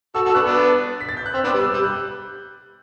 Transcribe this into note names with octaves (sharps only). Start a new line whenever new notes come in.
F#4 A4 E6
F#4 A4
E6
B3 D4 F#6
B3 D4
B6
A6
G6
F#6
C4 E6
B3 D4
D6
G3
E6
G3 G6
F#6